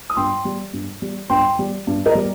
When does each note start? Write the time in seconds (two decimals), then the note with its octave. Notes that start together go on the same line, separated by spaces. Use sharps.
0.10 D#6
0.17 G2 G5 C6
0.45 G3
0.73 G2
1.02 G3
1.30 G2 G5 C6
1.59 G3
1.87 G2
2.06 A#4 D#5
2.15 G3